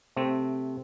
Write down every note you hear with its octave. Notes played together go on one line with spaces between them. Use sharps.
C3 A3 C4